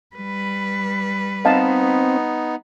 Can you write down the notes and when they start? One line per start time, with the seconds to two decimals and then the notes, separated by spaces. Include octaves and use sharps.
0.16 G3 B4
1.45 B3 C4 D#4 D#5 F5 A5